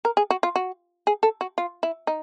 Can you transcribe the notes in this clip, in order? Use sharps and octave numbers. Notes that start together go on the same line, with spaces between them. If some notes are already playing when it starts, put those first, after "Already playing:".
A#4
G#4
F#4
F4
F#4
G#4
A4
F#4
F4
E4
D#4